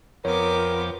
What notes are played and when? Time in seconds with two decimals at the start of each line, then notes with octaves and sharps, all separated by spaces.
0.25 F2 F3 B3 A#4 C#5 G5 D6